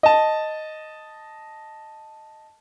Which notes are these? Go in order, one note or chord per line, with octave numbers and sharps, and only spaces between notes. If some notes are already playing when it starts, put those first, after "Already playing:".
D#5 A5